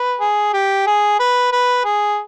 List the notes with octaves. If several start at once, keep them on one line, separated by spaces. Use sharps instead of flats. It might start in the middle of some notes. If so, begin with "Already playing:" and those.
Already playing: B4
G#4
G4
G#4
B4
B4
G#4